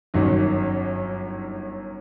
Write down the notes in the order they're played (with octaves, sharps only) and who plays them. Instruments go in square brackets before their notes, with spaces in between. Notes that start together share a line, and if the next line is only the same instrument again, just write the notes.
[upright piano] G1 F#2 D#3 F#3